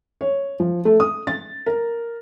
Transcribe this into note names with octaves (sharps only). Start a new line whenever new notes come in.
C#5
F3
A3
D#6
A6
A#4